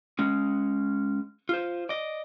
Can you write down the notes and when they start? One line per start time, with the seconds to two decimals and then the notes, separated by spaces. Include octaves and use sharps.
0.19 G#3 C#4
1.49 F4 C5
1.89 D5 D#5